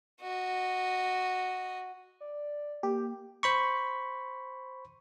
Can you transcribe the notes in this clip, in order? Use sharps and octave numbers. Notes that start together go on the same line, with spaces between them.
F#4 D#5
D5
A#3 G4
C5 B5 C#6